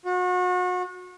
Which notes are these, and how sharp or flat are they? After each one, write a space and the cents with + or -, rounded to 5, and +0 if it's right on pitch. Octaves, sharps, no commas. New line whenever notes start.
F#4 -35